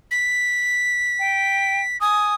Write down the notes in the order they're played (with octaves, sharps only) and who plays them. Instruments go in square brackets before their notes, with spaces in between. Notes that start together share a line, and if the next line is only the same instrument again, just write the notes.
[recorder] B6
[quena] G5
[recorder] G#5 [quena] D#6